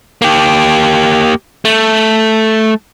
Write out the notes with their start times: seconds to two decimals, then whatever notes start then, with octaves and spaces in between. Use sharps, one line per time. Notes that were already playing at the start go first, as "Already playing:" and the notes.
0.22 A#3 G4
1.65 A3